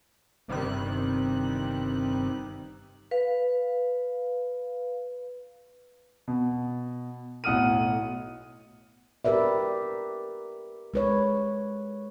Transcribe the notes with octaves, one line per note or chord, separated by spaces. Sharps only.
G1 C3 D#3 G3 F#6
B4 F5
B2
B1 A2 F#5 D#6 F6 D#7
G4 A#4 B4 D5 E5
G#3 B4 C#5